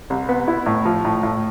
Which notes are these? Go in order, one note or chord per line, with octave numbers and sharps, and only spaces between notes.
C2
B3
E4
A2
F3
A2
A2